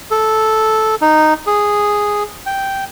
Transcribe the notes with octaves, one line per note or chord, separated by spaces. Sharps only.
A4
D#4
G#4
G5